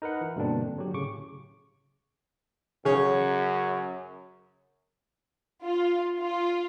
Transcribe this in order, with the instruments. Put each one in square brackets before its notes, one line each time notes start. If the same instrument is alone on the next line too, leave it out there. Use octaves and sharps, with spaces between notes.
[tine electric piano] D#4 A#4 B4 F#5
E3 E4
G2 B2 D3 A#3 C4 D4
D3 F#3 G4
A2 C#3 C#6 D6
[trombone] F#2 [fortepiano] C#3 C#5
[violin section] F4
F4